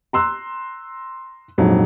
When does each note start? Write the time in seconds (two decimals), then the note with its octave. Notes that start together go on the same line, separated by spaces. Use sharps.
0.13 A#5 C6 E6 F#6
1.58 A#1 F2 G#2 F#3